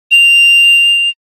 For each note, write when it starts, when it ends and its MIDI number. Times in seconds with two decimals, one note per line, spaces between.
0.11 1.09 101